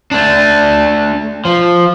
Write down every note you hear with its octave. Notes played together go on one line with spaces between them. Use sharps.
A3 D4
F3